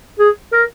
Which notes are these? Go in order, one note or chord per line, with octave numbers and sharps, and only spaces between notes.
G#4
A#4